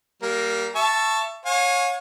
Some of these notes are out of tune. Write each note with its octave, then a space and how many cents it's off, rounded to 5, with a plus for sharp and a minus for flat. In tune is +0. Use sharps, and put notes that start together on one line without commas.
G3 -25 A#3 +0
E5 +25 A5 +0 C#6 +0
C#5 -10 F5 +45 G#5 +0